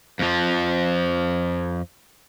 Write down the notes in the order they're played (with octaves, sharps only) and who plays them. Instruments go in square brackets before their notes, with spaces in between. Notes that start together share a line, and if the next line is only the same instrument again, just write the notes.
[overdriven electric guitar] F2 F3